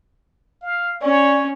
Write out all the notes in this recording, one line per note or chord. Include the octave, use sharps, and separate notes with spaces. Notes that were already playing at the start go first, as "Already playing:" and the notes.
F5
C#4 C#5 D5 G#5